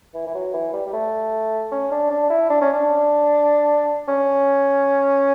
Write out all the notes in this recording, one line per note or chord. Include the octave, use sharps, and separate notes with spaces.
E3
E3
F#3
E3
G3
G3
A3
C#4
D4
D4
E4
D4
C#4
D4
C#4